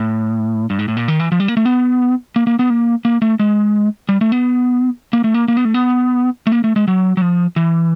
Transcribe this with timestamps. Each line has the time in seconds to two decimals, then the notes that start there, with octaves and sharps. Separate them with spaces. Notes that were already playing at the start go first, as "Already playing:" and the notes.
Already playing: A2
0.70 G2
0.79 G#2
0.88 A2
0.97 A#2
1.08 D#3
1.20 E3
1.32 F3
1.40 G3
1.48 A#3
1.57 A3
1.65 B3
2.36 A#3
2.47 A#3
2.59 B3
2.70 A#3
3.05 A#3
3.22 A3
3.40 G#3
4.09 G3
4.21 A3
4.32 B3
5.13 A#3
5.24 A3
5.34 A#3
5.48 A#3
5.57 B3
5.65 A3
5.74 B3
6.47 A3
6.52 A#3
6.64 A3
6.76 G#3
6.88 F#3
7.17 F#3
7.22 F3
7.56 E3